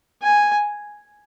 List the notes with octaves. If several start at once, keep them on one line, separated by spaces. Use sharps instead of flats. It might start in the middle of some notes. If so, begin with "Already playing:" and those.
G#5